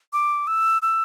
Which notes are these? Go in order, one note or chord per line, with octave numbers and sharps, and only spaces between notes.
D6
E6
E6